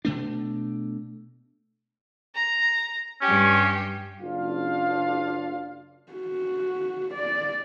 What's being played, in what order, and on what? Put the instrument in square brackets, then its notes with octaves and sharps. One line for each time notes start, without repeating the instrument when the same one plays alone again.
[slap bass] B2 A3 D4
[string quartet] A#5
[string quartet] G2 G4 [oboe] C#4
[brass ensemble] F#1 D4 F4 F5
[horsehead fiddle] F#4
D5